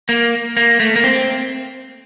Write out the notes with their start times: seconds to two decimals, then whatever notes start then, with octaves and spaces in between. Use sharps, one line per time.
0.09 A#3
0.57 A#3
0.80 A3
0.96 A#3
1.04 C4